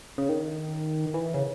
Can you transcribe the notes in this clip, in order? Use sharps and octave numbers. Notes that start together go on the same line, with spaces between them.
C#3
D#3
E3
C#3